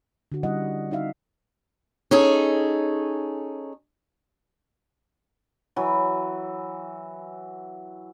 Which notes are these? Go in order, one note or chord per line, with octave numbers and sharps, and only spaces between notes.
D3 F#4
G3 C#4 E4 D#5 F#5
C4 D#4 F#4 E5 F5
C#4 D#4 G#4 A4
E3 F#3 F#4